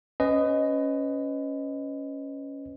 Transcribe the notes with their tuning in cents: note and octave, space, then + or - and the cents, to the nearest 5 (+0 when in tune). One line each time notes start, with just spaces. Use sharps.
C#4 +0 B4 +25 D#5 +0